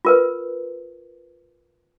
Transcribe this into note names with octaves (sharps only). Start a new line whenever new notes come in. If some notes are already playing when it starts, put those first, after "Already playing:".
F4 A#4 B4